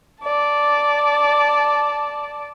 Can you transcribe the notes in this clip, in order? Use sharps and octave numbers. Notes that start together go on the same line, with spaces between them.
D5 A5